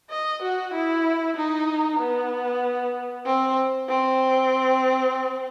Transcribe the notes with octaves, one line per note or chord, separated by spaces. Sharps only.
D#5
F#4
E4
D#4
B3
C4
C4